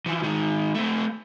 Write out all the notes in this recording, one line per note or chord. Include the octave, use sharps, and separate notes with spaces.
E3 F3
D#3 G#3
A3 C4